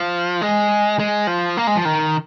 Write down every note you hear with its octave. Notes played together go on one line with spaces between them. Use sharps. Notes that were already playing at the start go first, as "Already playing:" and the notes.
Already playing: F3
G#3
G#3
F3
A#3
G#3
F3
D#3